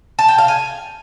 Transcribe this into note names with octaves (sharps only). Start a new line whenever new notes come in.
A5
G5
F5
G#5